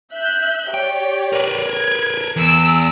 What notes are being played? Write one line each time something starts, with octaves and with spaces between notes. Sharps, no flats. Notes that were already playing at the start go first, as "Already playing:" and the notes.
E5 F#6 G6
G4 C#5 D5 G5
A#4 B4
G#6
E2 E6 D7